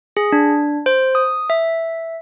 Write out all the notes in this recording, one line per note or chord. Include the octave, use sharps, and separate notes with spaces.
G#4
D4
C5
D#6
E5